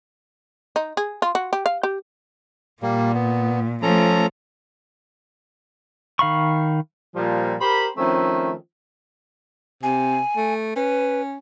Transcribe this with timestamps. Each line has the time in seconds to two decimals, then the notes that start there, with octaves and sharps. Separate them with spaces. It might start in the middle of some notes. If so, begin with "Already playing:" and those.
0.76 D#4
0.97 G#4
1.22 F4
1.35 F#4
1.53 G4
1.66 F5
1.83 G4
2.82 A#2 G3 A#3
3.14 B3
3.82 F3 A3 C#4 A4 A#5
6.19 D#3 F5 B5 C#6
7.16 A#2 F3 G3
7.61 G4 A#4 C5 B5
7.97 D#3 F3 A3 C4 C#4 E4
9.83 C3 G#5
10.36 A3
10.76 C#4 B4